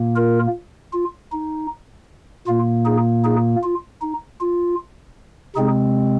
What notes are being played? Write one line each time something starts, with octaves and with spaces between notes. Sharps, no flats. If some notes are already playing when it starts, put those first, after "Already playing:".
Already playing: A#2 A#3
F4 A#4
F4
D#4
A#2 A#3 F4
D#4 G#4
D#4 G#4
F4
D#4
F4
C3 G#3 C4 D#4 G#4